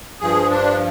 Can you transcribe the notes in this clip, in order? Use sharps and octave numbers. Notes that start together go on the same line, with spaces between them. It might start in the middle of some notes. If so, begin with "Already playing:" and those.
G2 F3 G#4
D4